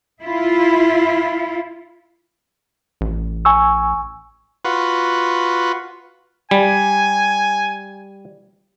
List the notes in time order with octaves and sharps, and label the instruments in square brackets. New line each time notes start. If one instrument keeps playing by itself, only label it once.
[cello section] E4 F4
[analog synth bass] A1
[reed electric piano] G#5 C#6 E6
[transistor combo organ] F4 F#4 B4
[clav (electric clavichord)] G3 [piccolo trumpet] G#5